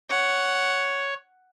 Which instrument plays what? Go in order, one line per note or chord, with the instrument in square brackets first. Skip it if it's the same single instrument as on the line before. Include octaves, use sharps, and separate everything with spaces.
[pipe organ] C#5 [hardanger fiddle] F#5